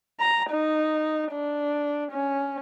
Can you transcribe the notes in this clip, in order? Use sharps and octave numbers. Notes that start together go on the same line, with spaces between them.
A#5
D#4
D4
C#4